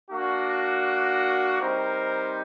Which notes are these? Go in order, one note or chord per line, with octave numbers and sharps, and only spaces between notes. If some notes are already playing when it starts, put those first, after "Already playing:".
A#3 D4 F#4
G3 C4 D#4 A#4 C5